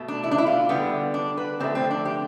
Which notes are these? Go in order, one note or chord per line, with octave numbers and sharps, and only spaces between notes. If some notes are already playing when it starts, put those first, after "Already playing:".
Already playing: B2 A3
D4
E4
D4
E4
F4
D3 G3 B3
D4
B4
D3 F3 A3 C4
C4
D4
G4